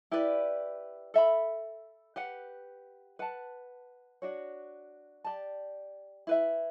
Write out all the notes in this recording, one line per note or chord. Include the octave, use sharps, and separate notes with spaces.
E4 G4 B4 D5
A4 E5 B5
G4 B4 F#5
B4 F#5 A5
D4 F#4 C#5
G4 D5 A5
E4 B4 E5